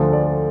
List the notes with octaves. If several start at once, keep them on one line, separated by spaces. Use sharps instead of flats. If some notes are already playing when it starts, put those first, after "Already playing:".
Already playing: D2 D3 F3 A3
D5